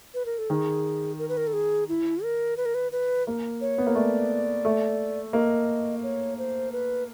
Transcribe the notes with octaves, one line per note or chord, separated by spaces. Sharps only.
B4
A#4
A4
D#3 G#4
A#4
B4
A#4
A4
G#4
E4
A#4
B4
A#4
B4
B4
A#3
C#5
B3
A#3
A3 D5
A3
A#3 D#5
C#5
C5
B4